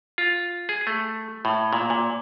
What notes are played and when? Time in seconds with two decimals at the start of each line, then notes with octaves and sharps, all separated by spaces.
0.18 F4
0.69 G#4
0.87 A3
1.45 A2
1.73 A#2
1.90 A#2